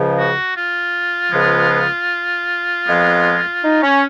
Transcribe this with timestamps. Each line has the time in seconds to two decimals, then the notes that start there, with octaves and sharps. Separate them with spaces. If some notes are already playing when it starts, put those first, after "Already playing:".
Already playing: C#2 C#3 F3
0.16 F#4
0.55 F4
1.32 C#2 C#3 F3 G#3 B3
2.86 F2 F3 G#3 B3
3.63 D#4
3.82 C#4